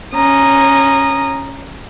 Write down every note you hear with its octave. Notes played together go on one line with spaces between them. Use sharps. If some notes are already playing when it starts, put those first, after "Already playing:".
C#4 A#5 D#6